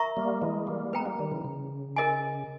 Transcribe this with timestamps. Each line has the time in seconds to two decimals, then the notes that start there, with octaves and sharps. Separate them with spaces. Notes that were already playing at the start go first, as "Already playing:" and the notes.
Already playing: A#4 E5 A#5 C#6
0.17 G3 A#3
0.42 E3 G#3
0.67 G3 A#3
0.93 G#3 B3 B4 G5 A#5
1.06 G3 A#3
1.19 D#3 G3
1.32 C#3 E3
1.45 C#3
1.96 A#4 D#5 G#5